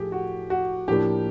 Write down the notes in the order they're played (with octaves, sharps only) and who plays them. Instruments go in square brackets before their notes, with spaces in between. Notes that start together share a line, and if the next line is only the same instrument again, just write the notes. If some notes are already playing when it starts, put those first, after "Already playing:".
Already playing: [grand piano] A2 F3 A3 G4 G#4
F#4
F#4
A2 F3 A#3 D4 G4